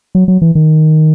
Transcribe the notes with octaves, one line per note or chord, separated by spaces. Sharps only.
F#3
F#3
E3
D#3